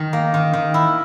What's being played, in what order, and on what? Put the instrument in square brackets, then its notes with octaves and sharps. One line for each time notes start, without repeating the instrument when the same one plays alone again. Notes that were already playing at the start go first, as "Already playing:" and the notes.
Already playing: [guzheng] D#3 D#4
A#3
D#3
D#3
E4